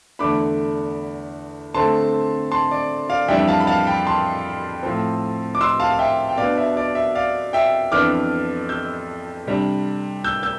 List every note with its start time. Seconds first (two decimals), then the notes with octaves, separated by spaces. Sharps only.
0.19 E2 D3 A3 D4 B5 D6
1.74 D3 A3 C4 A5 C6
2.52 A5 C6
2.71 D5
3.10 D5 F5
3.28 F2 E3 G3 D4 E5 G5
3.47 F5 A5
3.60 B5
3.67 F5 A5
3.87 G5 B5
4.07 A5 C6
4.83 A2 F3 C4
5.55 D6
5.61 C6 E6
5.80 F5 A5
5.90 F5
5.99 E5 G5
6.29 G5
6.37 B2 B3 D4 D5 F5
6.58 E5
6.77 D5
6.95 E5
7.15 D5 F5
7.53 E5 G5
7.92 F2 E3 B3 D4 D6 F6
8.69 E6 G6
9.47 C3 G3 D4
10.24 E6 G6
10.43 E6 G6